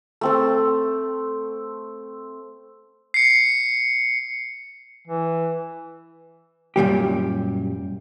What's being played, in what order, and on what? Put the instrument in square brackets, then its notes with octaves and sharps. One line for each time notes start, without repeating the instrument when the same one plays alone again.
[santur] A3 C4 A4
[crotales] C7 C#7
[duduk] E3
[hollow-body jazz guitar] F#2 A#2 G3 G4